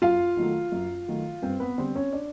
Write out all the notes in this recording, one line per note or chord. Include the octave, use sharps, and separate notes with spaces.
F#2 F4 F5
D#3 F#3 A3
F#2
D#3 F#3 A3
G2 C4 C5
B3 B4
D3 G3 C4 C5
C#4 C#5
D4 D5